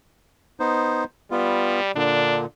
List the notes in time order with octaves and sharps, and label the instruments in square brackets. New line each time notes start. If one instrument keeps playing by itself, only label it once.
[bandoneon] B3 D#4 C5
[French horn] G3 [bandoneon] B3 F4
[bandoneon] A#2 D3 [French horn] D4